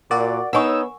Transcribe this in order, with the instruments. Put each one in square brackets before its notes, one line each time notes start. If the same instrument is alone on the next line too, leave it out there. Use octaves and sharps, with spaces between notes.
[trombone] A#2 [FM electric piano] F#4 D5 [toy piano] A#4
[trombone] B3 [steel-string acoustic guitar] D#4 C#5 [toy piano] F#5 G#5 C#6 [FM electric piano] E6